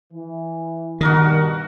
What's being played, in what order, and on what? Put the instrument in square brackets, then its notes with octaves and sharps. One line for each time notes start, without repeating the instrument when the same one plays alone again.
[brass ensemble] E3
[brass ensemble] G2 B2 [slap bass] D#3 [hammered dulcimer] F#4 A#4 D#5